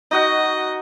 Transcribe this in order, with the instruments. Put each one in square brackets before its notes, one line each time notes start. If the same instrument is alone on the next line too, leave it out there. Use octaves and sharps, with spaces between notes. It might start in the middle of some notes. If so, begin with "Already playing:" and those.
[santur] D#4 F#4 F#5 [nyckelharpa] D#5